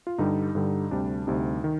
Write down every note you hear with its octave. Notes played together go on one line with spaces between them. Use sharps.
F4
G2 D3 G3 D#4
G2 D3 G3
D2 C3 G3 D4
D2 C3 G3 D#4
D#3